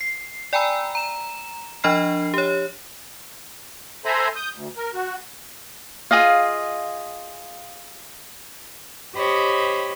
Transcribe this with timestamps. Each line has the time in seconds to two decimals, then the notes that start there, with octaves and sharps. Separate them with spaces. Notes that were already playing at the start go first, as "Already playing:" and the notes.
0.01 C7
0.53 D5 G5 G#5 A#5 B5 E6
0.95 A#5 E7
1.84 F3 D4 D#5 B5 F6 C7
2.34 G4 C#5
4.05 A4 C5 E5 G#5 A#5 B5
4.36 D#6 G6
4.54 D2
4.77 A#4
4.93 F#4
6.11 F4 G#4 D#5 F5
9.16 G4 C5 C#5 D#5 B5